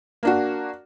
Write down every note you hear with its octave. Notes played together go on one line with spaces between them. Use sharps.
A#3 D4 F#4